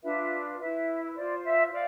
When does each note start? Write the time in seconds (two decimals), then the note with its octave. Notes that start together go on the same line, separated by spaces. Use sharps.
0.03 D4 F4 B4 E5
0.59 E4 B4 E5
1.15 F4 C5 D5
1.44 E5
1.71 C5 D5 F5